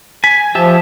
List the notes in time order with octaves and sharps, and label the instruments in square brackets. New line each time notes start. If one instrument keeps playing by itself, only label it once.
[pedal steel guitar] G#5 [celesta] B6
[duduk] F3 [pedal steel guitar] G4 E5 A5